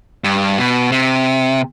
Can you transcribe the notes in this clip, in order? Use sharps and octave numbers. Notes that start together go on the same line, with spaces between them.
G2
B2
C3